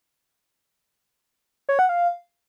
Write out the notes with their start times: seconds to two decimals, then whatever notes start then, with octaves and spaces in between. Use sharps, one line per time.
1.69 C#5
1.79 F#5
1.89 F5